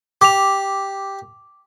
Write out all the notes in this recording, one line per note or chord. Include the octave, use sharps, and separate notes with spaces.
G4 D6 F7